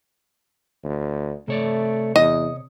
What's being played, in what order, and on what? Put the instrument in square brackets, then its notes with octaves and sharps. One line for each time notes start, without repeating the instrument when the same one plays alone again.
[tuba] D2
[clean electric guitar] C3 C#5 D5 [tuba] A3
[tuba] E2 [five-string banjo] D#5